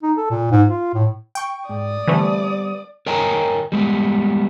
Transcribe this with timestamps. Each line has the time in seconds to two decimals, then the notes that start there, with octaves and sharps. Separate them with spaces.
0.03 D#4
0.17 A4
0.30 A#2
0.51 G#2
0.68 F4
0.94 A2
1.35 G5 C#6
1.69 G#2 D5 D#6
2.07 D3 E3 G3 A3 B3 C4
3.06 A#4 C#5 D#5 G5 G#5 A#5
3.72 G3 G#3 B3